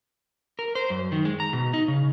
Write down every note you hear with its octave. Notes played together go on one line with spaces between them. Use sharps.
A#4
C5
F#2
D#3
G#3
A#5
B2
D#4
C#3